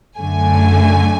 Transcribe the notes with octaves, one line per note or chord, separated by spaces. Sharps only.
F#2 D3 A3 G#5